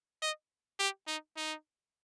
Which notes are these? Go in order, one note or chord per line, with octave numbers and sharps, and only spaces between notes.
D#5
G4
D#4
D#4